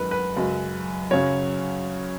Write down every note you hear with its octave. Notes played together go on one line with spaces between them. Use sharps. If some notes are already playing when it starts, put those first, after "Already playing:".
Already playing: F#2 D#3 G#3 B4
B4
F#2 C#3 G#3
F#2 C#3 F#3 C#5